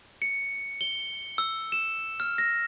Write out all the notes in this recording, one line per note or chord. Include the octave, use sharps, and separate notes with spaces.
C#7
G7
E6
E7
F6
A#6